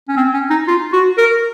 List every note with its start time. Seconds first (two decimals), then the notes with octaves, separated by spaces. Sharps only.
0.09 C#4
0.17 C4
0.34 C#4
0.50 D#4
0.68 F4
0.93 F#4
1.18 A#4